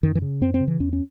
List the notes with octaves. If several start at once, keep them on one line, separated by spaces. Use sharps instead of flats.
F#2 D#3
E3
C#3
F#2 C4
C4
C#3
E3
E2 C#4
C#4